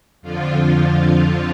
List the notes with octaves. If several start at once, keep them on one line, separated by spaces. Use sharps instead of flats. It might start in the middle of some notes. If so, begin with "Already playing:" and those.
F2 D3 F3 F4